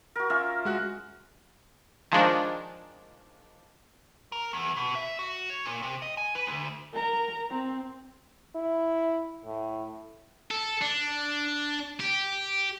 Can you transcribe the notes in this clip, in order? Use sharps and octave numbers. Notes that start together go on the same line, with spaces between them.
F#4 A#4
C#4 F4 E5
G#3 F#4 F#6
D#3 F3 G#3 D4
A#4
E2
B2
E5
F#4
C#5
A#2
C3
D#5
G#5
B4
D2
A#4 A#5
C4
E4
A2
A4
D4
G4